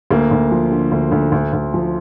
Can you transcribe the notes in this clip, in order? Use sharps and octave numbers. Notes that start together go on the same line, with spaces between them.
D2 A#3
D2
F3
D3
D2
D2
D2
D2
F3